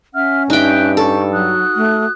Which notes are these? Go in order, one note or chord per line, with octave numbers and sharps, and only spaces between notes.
C#4 E5 F#5 F6
G2 D#4 E5 G5 F#6
A4 C#6
F#3 F#4 D#6 F#6
A3